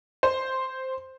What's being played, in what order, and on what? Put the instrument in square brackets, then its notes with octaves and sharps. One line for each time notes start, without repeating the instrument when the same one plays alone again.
[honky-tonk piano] C5